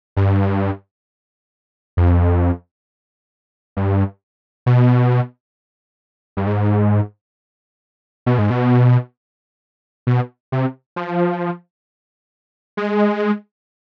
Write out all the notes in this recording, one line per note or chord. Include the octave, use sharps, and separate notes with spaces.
G2
F2
G2
B2
G2
G#2
B2
G#2
B2
B2
C3
F3
G#3